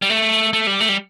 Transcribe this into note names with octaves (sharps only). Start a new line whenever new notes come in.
G3
A3
A3
G3
A3
G3